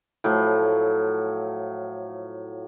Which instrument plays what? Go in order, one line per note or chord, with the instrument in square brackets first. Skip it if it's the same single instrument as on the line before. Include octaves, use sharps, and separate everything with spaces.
[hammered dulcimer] A2 F3 F#3